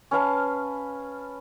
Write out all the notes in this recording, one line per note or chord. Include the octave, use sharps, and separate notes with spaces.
C#4 B4 F5 A5